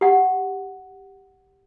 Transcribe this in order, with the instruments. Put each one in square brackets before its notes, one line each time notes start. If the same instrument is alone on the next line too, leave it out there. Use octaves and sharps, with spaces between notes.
[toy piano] G4 F#5